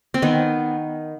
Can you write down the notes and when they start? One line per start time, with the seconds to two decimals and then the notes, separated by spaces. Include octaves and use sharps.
0.14 C4
0.22 D#3 B3